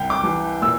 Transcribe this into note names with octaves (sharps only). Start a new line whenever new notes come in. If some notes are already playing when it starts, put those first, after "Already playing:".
Already playing: C2 G5
D6
E3
A#2 E6